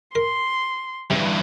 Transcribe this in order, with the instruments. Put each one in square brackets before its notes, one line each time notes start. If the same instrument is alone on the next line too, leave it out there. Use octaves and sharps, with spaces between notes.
[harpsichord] A#4 [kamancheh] C6
[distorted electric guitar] E2 G2 [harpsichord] C3